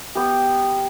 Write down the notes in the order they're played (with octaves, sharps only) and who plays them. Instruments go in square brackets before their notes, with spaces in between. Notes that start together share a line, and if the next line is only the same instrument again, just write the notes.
[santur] B3 G4